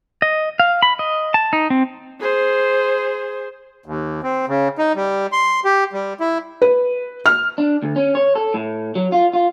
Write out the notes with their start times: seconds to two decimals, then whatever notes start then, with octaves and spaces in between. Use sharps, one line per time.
0.22 D#5
0.60 F5
0.82 B5
0.99 D#5
1.34 A5
1.53 D#4
1.70 C4
2.21 G#4 C5
3.86 D#2
4.23 C4
4.49 C#3
4.78 D#4
4.95 G3
5.32 C6
5.64 G4
5.93 G3
6.20 E4
6.62 B4
7.26 F6
7.58 D4
7.82 D2
7.96 C#4
8.15 C#5
8.35 A4
8.54 A2
8.95 F#3
9.12 F4
9.33 F4